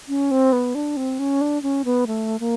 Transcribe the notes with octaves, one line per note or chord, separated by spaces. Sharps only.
C#4
C4
B3
D4
C4
C#4
D4
C#4
B3
A3
A#3